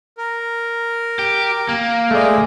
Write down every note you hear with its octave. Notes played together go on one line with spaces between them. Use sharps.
A#4
G4
A#3
G#3 A3 D5